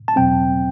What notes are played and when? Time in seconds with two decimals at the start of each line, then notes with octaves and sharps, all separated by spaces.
0.08 A5
0.16 E2 B2 F#3 C4 G5